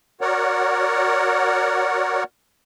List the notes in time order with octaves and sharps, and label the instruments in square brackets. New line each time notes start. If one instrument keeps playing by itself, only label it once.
[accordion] F#4 A#4 C#5 D5 F#5